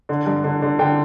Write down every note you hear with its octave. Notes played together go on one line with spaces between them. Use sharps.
D3
G2
D3
D3
D3 G5